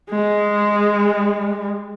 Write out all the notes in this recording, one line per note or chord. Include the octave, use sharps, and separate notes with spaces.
G#3